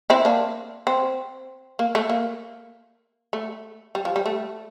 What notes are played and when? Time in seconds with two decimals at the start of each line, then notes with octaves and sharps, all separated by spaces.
0.10 C4 E4
0.25 A#3 D4
0.87 C4
1.79 A#3
1.95 A3
2.09 A#3
3.33 A3
3.95 G3
4.05 F3
4.16 G3
4.26 A3